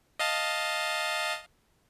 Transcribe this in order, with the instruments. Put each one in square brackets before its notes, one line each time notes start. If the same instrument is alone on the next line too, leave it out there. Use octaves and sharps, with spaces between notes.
[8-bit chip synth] D#5 F5 A5